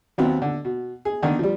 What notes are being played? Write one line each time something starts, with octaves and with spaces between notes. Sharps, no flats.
D#2 F#3 B3 C4
D3
B2
G#4
D3 D#3 D4
F3 G3